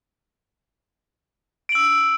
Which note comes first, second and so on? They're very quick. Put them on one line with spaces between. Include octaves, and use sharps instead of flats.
D7 F#7 E6